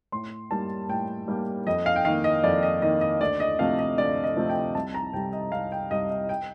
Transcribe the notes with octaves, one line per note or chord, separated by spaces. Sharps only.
A2 C6
G3 A#3 A5
A2 G5
G3 A#3
F2 D#5
F5
G5
D#3 A#3 F5
D#5
F2 D5
D#5
D#3 A#3 D#5
D#5
D2 D5
D#5
C3 F3 A3 C4 F5
D#5
D2 D5
D#5
C3 F3 A3 C4
G5
C2 A5
A#5
C3 G3 G5
D#5
C2 F5
G5
C3 G3 D#5
D#5
G5